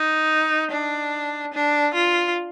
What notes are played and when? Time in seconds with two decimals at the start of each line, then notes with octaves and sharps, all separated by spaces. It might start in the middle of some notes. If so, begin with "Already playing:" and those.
Already playing: D#4
0.71 D4
1.53 D4
1.94 F4